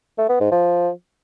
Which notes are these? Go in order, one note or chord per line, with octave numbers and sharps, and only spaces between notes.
A3
B3
G#2
F3